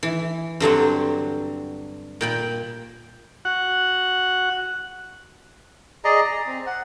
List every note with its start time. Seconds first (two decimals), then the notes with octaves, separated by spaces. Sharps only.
0.03 E3
0.60 G2 D3 F#3 C4
2.21 A#2 G5 B5
3.45 F#4 F#5
6.04 G#4 D5 D#5 A#5
6.24 A#5
6.47 C4
6.67 F#5